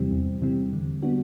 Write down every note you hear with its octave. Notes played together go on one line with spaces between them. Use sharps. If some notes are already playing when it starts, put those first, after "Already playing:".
Already playing: E2 C3 E3 G3 C4
E2
C3 E3 G3 C4
D3
G3 B3 D4 F#4